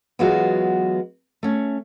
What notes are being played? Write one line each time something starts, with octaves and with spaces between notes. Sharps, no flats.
E3 F#3 G#3 B3 F4 F#4
A3 C#4